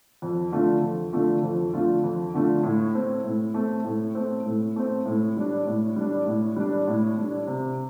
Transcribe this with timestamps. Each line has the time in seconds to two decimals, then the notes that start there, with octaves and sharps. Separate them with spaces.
0.22 F2
0.52 D3 A3 F4
0.82 F2
1.13 D3 A3 F4
1.43 F2
1.73 D3 A3 F4
2.04 F2
2.34 D3 A3 F4
2.63 A2
2.95 A3 C4
3.24 A2
3.54 A3 C4
3.85 A2
4.15 A3 C4
4.46 A2
4.76 A3 C4
5.06 A2
5.37 G3 D4
5.67 A2
5.96 G3 D4
6.26 A2
6.56 G3 D4
6.87 A2
7.17 G3 D4
7.47 C3